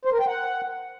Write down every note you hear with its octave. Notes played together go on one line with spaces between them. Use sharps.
C5
A#4
G5
F#5